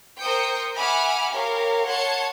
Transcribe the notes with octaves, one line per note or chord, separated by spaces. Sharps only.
A#4 C5 G5 D#6 G6 C#7
E5 F#5 G#5 B5 D6 F6
G4 A#4 C#5 F5
C#5 F#5 A5 C6 G#6 C#7